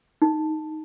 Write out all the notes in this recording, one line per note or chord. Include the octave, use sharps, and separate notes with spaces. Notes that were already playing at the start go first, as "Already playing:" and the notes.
D#4